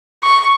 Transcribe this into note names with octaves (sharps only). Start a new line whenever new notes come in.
C#6